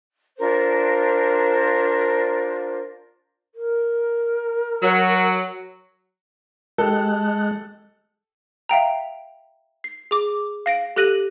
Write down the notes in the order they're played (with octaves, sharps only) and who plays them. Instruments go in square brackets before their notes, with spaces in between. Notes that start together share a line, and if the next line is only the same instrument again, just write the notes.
[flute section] D4 F4 A#4 C5
[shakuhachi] A#4
[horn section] F#3
[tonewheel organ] G#3 F#6 [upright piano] G4 A4
[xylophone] E5 F5 G5 A#5
C7
G#4 D6
F5 A#6 D7
G4 A4 F#6 A#6 D#7 F#7